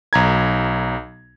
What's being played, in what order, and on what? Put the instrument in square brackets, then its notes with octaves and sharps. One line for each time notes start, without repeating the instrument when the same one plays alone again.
[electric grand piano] B1 A#5 G#6